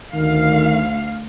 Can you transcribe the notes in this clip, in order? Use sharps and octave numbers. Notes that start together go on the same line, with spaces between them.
D2 D#3 F5